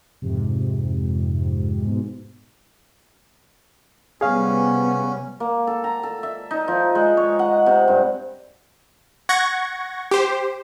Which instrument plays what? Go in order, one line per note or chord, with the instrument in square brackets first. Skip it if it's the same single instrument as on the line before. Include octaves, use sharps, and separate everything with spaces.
[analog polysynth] F2 G#2 C3
G#2 B2
[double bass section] C3 G3 B3 [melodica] C#4 [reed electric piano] G#4 F5
[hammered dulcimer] A#3
A4
A#5
A4
E5
D#4
F3
G#3
C#5
F#5
C3
G2
[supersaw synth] F#5 C#6 G#6 A#6
G4 C5